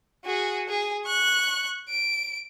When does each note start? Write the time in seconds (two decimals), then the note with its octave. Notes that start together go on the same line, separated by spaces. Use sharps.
0.25 F#4 G#4
0.69 G#4
1.06 C#6 F#6
1.89 D7